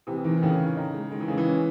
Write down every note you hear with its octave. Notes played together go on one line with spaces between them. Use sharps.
C3 E3
D#3 E3
D#3
A2 C#3
C#4
D#4
G#3
D#3 G#3
E3
C#3 G#3
E3
C#4